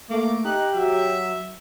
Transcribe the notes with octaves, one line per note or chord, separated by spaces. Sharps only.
A3 A#3 D6
D#4 G4 F#6
F#3 E5